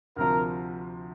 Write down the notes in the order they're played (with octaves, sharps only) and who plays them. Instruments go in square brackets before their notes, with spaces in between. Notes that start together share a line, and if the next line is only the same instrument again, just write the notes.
[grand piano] D2 C3 F3 [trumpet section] A#4